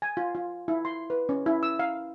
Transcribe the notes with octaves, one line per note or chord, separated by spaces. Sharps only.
G#5
F4
F4
E4
C6
B4
C#4
E4
E6
F5